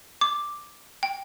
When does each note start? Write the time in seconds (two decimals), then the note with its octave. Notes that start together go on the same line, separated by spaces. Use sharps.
0.21 D6
1.03 G5